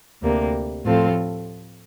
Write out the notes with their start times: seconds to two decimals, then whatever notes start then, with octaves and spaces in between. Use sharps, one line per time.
0.22 D2 C3 G3 A#3
0.85 A2 F3 C4 F4 A4